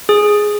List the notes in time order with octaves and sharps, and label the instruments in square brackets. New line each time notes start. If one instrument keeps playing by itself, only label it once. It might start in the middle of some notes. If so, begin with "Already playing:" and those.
[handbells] G#4